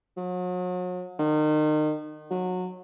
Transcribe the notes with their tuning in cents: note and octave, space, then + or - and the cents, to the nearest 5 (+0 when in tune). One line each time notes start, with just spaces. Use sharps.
F#3 -40
D#3 -30
F#3 -20